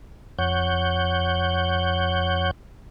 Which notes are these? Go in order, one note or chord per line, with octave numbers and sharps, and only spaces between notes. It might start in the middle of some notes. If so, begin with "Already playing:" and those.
F2 C#5 F#5 G6